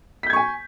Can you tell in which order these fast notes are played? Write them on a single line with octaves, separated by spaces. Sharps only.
B6 G6 G#6 C#6 G#5